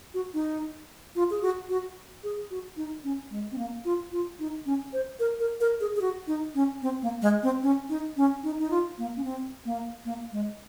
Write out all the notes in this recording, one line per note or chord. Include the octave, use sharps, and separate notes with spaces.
F#4
D#4
F4
G#4
F#4
F#4
G#4
F#4
D#4
C#4
G#3
C4
A#3
F4
F4
D#4
C#4
C5
A#4
A#4
A#4
G#4
G#4
F#4
D#4
C#4
C4
A#3
G#3
C4
C#4
D#4
C#4
D#4
D#4
F4
A#3
C#4
C4
A#3
A#3
G#3